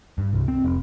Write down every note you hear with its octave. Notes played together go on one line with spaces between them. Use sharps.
G2
C2
C4
F1